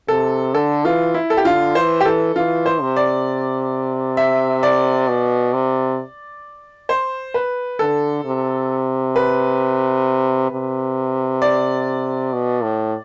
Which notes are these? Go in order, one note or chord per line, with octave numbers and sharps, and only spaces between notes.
C3 A4
D3 A4
E3 F4
E4
A4
G4
D3 F4
E3 C5
G4
E3 A4
E3 F4
C5
C3
D5
E5
D5
B2
C3
C5
B4
D3 A4
C3
B4
C3
D5
B2
A2